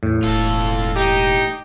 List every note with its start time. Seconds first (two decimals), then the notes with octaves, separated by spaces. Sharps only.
0.03 E2 A2
0.23 E1 F4 A4
0.96 D#4 G4